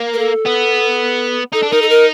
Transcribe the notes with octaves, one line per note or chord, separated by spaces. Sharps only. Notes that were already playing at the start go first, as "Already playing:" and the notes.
Already playing: A#3
A#4
A4
B3
D#4 A4
D4
D#4 A#4
A4
A#4